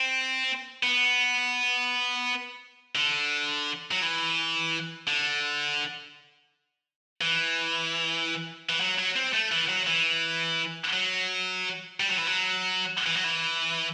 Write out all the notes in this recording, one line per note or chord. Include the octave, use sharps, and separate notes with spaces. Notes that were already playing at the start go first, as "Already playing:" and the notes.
Already playing: C4
B3
D3
F#3
E3
D3
E3
E3
F#3
F#3
C4
A3
E3
F#3
E3
F#3
G3
F#3
E3
F#3
E3
F#3
E3